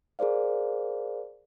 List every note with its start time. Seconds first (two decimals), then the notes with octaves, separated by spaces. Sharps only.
0.19 G#4 A#4 C5 D5 F5